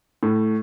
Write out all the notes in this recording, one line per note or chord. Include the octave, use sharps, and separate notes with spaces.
A2